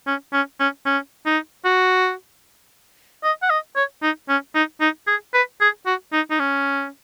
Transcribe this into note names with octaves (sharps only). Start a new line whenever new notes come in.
C#4
C#4
C#4
C#4
D#4
F#4
D#5
F#5
D#5
C#5
D#4
C#4
D#4
D#4
G#4
B4
G#4
F#4
D#4
D#4
C#4